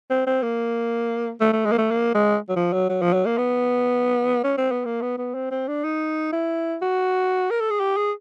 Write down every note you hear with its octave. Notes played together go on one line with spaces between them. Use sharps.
C4
C4
A#3
A3
A3
G#3
A#3
A3
A#3
G#3
F#3
F3
F#3
F#3
F3
F#3
A#3
B3
C#4
C4
B3
A#3
B3
B3
C4
C4
D4
D#4
E4
F#4
A#4
A4
G#4
G4
G#4